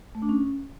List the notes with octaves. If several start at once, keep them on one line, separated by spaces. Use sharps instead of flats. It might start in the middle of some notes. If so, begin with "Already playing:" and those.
A3
D4
C#4